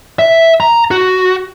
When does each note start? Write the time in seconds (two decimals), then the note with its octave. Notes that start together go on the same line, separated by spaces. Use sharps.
0.19 E5
0.60 A#5
0.91 F#4